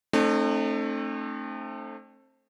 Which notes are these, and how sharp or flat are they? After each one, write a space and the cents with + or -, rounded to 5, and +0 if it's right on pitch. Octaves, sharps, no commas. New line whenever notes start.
A3 +0 C4 +30 D#4 -40